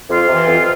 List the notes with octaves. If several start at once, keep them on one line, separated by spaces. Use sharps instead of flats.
F2 F4
C3 E3
F2